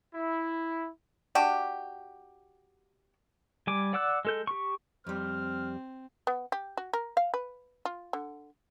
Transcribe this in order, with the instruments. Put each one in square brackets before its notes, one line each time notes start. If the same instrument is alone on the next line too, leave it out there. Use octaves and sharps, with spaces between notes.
[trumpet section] E4
[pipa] D4 F#4 G4
[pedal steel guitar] G3 G#5 D6
D5 F#5 D6 E6 F#6
G#3 A4 G6
G4 C#6
[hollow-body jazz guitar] F2 G3 [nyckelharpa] C4 [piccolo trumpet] F6
[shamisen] B3
G4
F#4
A#4
F5
B4
F4
D3